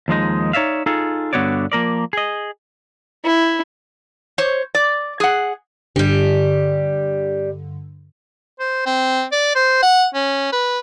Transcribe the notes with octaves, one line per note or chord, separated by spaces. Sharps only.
D#2 F3 G#3 D#4
D#4 C#5 D5 E5 F5
D#4 F4 G#4 A4
G2 D3 B3 F#4 C#5 D5
F3 A#3 A#4 D5
G#4 D#5
E4
C5 C#5
D5
G#4 F#5
G2 D3 G3 G4
C5
C4
D5
C5
F#5
C#4
B4